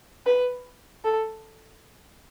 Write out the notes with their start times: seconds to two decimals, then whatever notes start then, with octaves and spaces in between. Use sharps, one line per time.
0.26 B4
1.04 A4